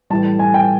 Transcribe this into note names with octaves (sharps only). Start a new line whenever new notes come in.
A2 E3 G3 A5
G#5
G5